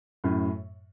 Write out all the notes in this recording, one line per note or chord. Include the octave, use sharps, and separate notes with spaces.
F#2 A2